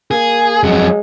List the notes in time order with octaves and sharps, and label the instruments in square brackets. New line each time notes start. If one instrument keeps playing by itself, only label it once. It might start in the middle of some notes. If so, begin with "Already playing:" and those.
[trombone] A#3 [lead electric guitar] G#4
[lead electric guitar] F2 F#3 [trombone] G#3